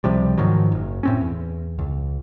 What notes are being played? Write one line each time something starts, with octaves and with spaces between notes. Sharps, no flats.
C#2 C3 F3 G3
G#2 D#3 F3 F#3
F#1
A2 C4 C#4
E2
C#2